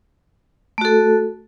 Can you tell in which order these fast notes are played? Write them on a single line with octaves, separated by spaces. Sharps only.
A3 F#4 A4